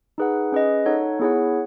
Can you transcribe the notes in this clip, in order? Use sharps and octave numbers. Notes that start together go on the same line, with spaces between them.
D#4 G#4 B4 F#5
C#4 G#4 B4 D#5
D#4 A4 C#5 F#5
B3 E4 G#4 C#5 F#5